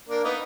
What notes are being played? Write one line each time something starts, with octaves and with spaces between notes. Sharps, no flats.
A#3 D4
B3 D#4